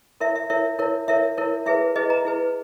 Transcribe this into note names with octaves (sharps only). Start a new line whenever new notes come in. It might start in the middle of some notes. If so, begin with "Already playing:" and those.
E4 A#4 C#5 E5
E5
E4 A#4 C#5 E5
E4 A#4 C#5
E4 A#4 C#5 E5
E4 A#4 C#5
E4 G#4 B4 E5
E4 G#4 B4 D#5
A#5
E4 G#4 B4